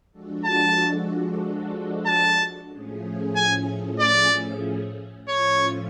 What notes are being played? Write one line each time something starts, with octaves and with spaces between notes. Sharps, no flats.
F3 G#3 D4 F#4 A4
A5
A5
A2 F3 A3 C#4 G#4
G#5
D5
A2 F3 A3 C#4 F4 C#5